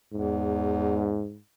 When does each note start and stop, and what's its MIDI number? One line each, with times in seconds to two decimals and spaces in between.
0.13 1.30 40
0.13 1.38 44